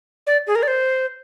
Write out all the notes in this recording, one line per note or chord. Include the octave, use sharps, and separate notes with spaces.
D5
G#4
A#4
D5
C5